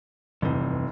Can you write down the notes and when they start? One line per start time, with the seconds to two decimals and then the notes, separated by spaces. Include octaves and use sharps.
0.42 F1 E2 G2 C3